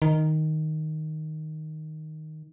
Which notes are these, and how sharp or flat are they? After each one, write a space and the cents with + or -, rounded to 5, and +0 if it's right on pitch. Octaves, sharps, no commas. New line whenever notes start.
D#3 +0